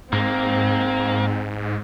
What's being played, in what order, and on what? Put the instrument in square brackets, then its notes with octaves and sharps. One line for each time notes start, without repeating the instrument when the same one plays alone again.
[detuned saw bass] G#2 [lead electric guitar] A#3 [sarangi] C4